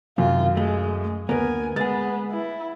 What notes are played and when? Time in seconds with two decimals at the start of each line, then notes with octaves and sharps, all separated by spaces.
0.18 F#2 C3 D#3 F4
0.57 G#3 A3
1.29 D2 A#3 B3 A#4 G#5
1.76 G#3 B3 G#4 A6
2.31 E4